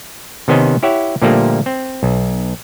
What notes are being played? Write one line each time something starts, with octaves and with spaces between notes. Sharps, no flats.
C3 D#3 B3 C#4 C5 D#5
E4 G4 C#5 E5 F#5
A#2 D3 F3 G3 A3 A#3
C4
B1